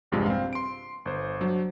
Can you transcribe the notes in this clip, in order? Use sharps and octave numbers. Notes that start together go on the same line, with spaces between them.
A#1 E2 G2 C3 G#3 F4
C4 F5
C6 D7
G1 C5
F#3 D4 C5